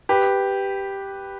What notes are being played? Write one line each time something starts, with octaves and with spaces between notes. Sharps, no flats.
G4 B4